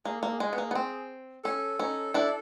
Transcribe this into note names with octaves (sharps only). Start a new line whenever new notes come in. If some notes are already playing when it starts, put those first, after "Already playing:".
A#3 G#4
A#3 A4
G#4
G#3
B3
A#3
B3
C4
C#4 A4
C#4 D#4
D4 E4